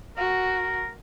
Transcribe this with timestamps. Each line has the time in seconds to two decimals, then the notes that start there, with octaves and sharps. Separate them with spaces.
0.18 F#4 A#4